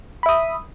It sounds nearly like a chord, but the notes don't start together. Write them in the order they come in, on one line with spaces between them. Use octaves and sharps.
B5 E5 D#6